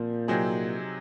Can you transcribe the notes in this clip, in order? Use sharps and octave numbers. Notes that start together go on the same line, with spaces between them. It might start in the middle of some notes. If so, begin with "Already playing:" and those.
Already playing: A#2 F3 C4
C3 F#3 C4 D#4 G#4